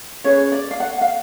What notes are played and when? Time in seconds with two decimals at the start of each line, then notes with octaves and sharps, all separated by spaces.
0.24 C#4 G#4 B4 C#5
0.52 D5
0.71 F5
0.80 F#5
1.01 F5